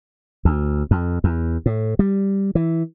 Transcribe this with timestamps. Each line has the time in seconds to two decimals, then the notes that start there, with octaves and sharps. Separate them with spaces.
0.45 D2
0.91 F2
1.24 E2
1.66 A2
1.99 G3
2.55 E3